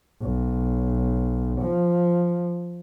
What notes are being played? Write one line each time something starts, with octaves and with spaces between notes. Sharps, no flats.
B1
F3